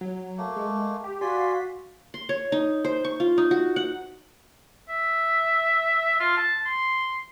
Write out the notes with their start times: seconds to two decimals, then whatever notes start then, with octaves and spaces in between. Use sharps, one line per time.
0.01 F#3
0.38 A3 A#3
0.56 G#3
1.04 G4
1.21 F#4 D5 F5 G#5 C6 B6
2.14 C6
2.29 C#5
2.52 D#4
2.85 C5
3.05 C#6
3.20 F4
3.38 D#4
3.51 F#4
3.76 F#5
4.89 E5
6.19 F4
6.37 A5
6.65 C6